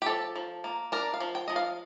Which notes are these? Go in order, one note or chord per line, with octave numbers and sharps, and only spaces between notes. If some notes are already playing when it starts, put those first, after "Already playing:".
G4
F3 A4
F3
A#3
D4 A#4
F5
F3
G5
F3 D#5
F5